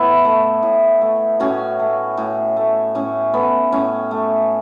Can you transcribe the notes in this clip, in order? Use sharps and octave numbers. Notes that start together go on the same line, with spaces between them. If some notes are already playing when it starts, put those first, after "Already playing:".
Already playing: A2 B3 E4
A3
A2
A3
A2 C#4 F#4
A3
A2
A3
A2 C#4
A3 B3
A2 C#4
A3